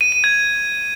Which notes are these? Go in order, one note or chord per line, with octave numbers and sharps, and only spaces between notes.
D#7
D#7
G#6